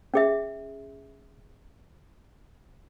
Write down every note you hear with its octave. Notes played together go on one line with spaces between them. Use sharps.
C#4 G#4 E5